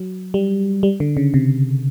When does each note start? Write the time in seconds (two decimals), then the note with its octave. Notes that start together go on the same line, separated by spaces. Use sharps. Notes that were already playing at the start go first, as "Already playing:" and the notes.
Already playing: F#3
0.34 G3
0.83 G3
1.00 D3
1.17 C#3
1.34 C3